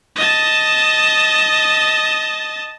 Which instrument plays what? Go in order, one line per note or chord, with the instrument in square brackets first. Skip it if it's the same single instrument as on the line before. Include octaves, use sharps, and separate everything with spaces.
[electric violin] D#5 A5